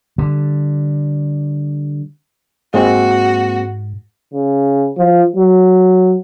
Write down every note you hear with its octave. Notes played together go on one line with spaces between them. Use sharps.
D3 G3
G#2 G#3 A#3 C4 F#4
C#3
F3
F#3